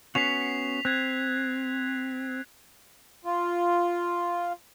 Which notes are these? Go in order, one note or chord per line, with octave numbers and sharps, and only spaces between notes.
B3 C#4 F#4 B6 C7 F7
C4 F#6 G#6
F4